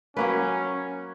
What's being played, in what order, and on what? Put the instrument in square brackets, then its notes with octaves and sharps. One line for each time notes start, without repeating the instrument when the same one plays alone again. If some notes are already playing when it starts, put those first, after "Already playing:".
[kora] F#3 A#3 B4 [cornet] C#4